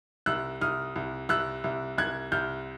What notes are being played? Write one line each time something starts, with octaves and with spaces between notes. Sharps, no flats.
C2 E6 F#6
C2 D#6 F6
C2
C2 E6 F#6
C2
C2 F#6 G#6
C2 F6 G6